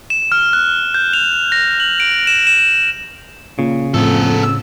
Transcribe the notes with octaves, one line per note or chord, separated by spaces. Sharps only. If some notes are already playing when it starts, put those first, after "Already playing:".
E7
F6
F#6
G6
F7
A#6
F#7
D7
E7
E7
E7
A#2 C#3
F2 A2 B3 A4
E6